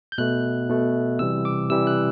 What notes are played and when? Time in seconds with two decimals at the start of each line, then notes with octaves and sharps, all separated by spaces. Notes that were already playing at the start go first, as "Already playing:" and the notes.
0.12 G6
0.18 B2 A3 F#6
0.69 B2 A3
1.19 C3 E3 G3 E6
1.45 D6
1.70 C3 E3 G3 E6
1.87 F#6